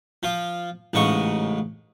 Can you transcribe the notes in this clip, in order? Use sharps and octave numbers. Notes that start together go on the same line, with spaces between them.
F3 F4
A1 G#2 C#3 D#5 C#6